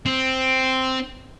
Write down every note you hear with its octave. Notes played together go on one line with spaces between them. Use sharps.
C4